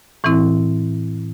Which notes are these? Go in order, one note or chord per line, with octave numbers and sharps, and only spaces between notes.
A2 E3 C4 E4